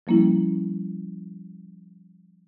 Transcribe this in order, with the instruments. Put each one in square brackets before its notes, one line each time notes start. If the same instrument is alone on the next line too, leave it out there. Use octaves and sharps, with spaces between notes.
[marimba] F3 G3 A#3 C#4 E4